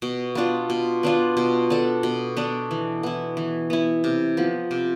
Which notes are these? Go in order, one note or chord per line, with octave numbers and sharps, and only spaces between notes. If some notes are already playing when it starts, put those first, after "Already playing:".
B2
B3 D4 F4
B2
B3 D4 F4
B2
B3 D4 A4
B2
B3 D4 A4
E3
B3 E4
E3
B3 E4
C3
F3 B3
C3